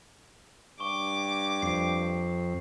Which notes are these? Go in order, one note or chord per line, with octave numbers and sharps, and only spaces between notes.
G2 C#6 D6
F2 C7